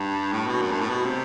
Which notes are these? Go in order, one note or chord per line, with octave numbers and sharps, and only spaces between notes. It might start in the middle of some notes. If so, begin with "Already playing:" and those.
Already playing: G2
A2
B2
F#2
G2
A2
B2
C3